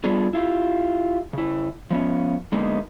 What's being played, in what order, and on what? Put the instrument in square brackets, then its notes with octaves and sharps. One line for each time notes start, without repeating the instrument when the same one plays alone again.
[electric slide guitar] G3 B3 D4 F4 G#4
E4 F4 G4
C#3 E4
F3 B3 C#4
D3 G#3 A#3 B3 D#4